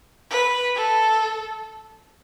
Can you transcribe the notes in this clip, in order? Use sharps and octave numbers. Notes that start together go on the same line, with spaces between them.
B4
A4